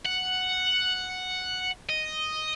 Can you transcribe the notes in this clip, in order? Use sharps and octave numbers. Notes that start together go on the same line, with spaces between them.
F#5
D#5